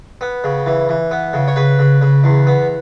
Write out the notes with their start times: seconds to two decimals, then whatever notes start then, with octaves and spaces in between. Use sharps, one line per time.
0.21 B3
0.44 C#3
0.66 E3
0.89 E3
1.11 B3
1.33 C#3
1.48 C#5
1.56 C#3 B4
1.79 C#3
2.02 C#3
2.24 E2
2.47 B3